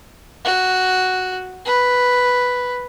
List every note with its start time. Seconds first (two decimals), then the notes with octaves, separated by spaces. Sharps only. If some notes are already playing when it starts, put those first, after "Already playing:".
0.45 F#4
1.66 B4